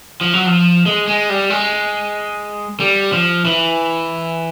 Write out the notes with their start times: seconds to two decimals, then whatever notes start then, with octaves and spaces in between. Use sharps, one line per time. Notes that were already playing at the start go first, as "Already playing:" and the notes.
0.21 F3
0.33 F#3
0.46 F3
0.86 G#3
1.07 G#3
1.29 G3
1.50 G#3
2.80 G3
3.12 F3
3.45 E3